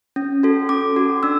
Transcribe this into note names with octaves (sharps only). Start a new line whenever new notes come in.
C#4
F#4 A4
C#4 D6
F#4 A4
D4 E6